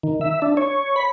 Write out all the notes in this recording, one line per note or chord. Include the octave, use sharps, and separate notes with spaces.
D#3
E5
D4
C#5
B5